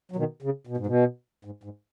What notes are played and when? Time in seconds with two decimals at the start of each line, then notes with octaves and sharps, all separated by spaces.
0.12 F#3
0.16 B2 D#3
0.42 C#3
0.67 B2
0.77 G#2
0.87 B2
1.45 G#2
1.63 G#2